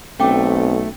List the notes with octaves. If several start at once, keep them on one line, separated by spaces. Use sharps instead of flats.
B1 A3 C4 C#4 G5 D6